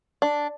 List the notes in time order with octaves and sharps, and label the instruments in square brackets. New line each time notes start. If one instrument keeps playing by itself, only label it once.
[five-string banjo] D4